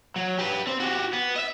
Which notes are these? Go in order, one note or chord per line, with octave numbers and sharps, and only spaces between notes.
F#3
G4 B4
C4
F#4 G4
B3
D#5 E5